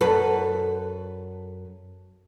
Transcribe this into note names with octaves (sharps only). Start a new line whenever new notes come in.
F#2 A4 B4